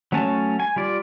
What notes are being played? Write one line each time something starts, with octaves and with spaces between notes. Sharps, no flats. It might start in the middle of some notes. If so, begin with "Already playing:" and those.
F#3 A3 C#4 G#5 A5
G#5
G3 F4 D5